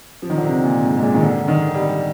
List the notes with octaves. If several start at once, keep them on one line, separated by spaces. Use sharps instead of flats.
F3
D#3
D3
C3
A#2
G#2
G#2
A#2
D#3
D3
D#3
G3